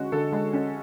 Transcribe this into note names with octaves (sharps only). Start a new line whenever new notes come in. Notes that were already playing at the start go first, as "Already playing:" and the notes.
Already playing: D3 G#3 C#4 F#4
D3 A4
G#3
C#4